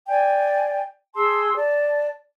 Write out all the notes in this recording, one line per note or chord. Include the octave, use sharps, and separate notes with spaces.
D5 G5 G#5
G#4 A5 C6 E6
D5 A5